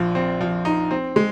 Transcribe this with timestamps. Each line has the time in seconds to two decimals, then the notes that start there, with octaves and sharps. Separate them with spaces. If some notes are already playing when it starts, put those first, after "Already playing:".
Already playing: A#1 F3
0.15 C4
0.41 F3
0.65 D#4
0.91 C4
1.16 G#3